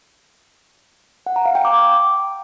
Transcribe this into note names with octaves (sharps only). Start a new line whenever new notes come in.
F#5
A#5
F5
G5
D6